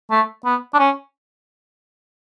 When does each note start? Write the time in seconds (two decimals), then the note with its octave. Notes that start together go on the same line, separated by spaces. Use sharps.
0.11 A3
0.45 B3
0.74 D4
0.79 C#4